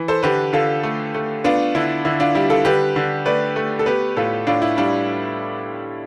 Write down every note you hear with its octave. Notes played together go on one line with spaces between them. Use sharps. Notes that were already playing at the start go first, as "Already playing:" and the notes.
Already playing: E3
A4 C5
D3 G4 B4
D3 F4 A4
A3
A3
B3 D4 F4
D3 E4
D3 E4
D4 F4
G3 E4 G4
F4 A4
D3 G4 B4
D3
A3 B4 D5
A3
A4
B3 G4 B4
A2 F4 A4
A2 D4 F4
E4
G3 D4 F4